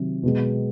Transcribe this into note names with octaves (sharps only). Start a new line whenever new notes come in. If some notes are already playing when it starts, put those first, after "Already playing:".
Already playing: C3 D#3 F#3
B2 G#3 B3